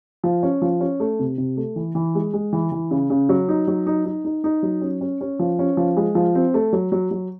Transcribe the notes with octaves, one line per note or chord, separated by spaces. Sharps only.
F3
C#4
F3
C#4
A3
C3
C3
A3
E3
E3
G#3
G#3
E3
E3
C#3
C#3
F#3
D#4
F#3
D#4
D#4
D#4
D#4
F#3
C#4
C#4
C#4
F3
C#4
F3
G#3
F3
C4
A3
F#3
F#3
F#3